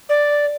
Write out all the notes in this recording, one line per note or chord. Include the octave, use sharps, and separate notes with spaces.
D5